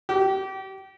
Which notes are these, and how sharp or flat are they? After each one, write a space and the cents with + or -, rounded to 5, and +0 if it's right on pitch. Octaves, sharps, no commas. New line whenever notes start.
G4 -30